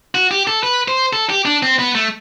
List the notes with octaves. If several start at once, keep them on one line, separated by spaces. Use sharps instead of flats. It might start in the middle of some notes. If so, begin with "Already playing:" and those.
F#4
G4
A4
B4
C5
A4
G4
D4
C4
B3
A3